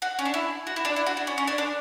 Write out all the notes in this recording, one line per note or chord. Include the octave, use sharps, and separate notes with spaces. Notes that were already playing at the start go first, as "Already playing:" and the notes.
F#4
C#4
D4
E4
F#4
E4
D4
E4
F#4
D4
C#4
C#4
D4
D4